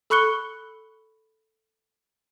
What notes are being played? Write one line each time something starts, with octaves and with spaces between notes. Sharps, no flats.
A4 B5 C#6 F#6 C#7 G7